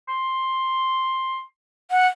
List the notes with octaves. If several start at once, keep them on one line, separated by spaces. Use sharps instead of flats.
C6
F#5